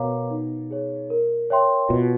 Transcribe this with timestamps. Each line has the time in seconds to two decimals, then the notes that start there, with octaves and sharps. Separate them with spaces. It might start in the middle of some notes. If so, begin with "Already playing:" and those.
Already playing: B2 A#4 C#5 F5 A#5 D6
0.30 D#4
0.71 G#4 C#5
1.10 A#4
1.50 C#5 E5 G5 C6
1.89 B2 F4